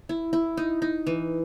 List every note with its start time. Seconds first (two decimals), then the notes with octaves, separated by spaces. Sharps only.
0.09 E4
0.33 E4
0.57 D#4
0.82 D#4
1.07 E3